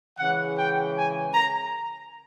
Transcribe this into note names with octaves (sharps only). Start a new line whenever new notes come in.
C#3 E3 G#3 F#5
G5
G#5
A#5